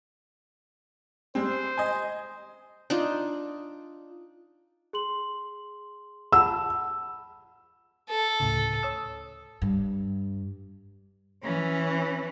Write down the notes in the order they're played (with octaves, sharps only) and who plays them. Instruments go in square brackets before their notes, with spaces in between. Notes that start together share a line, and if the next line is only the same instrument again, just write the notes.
[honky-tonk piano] G3 G#3 C4 [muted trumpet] C5
[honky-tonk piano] D#5 G#5
[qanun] D4 D#4 F4
[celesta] G#4 C6 F#7
[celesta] F#5 A5 B5 [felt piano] E6
[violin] A4
[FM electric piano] D2 A2 C#3
C#5 D#6 E6
[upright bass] G2
[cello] E3 C#4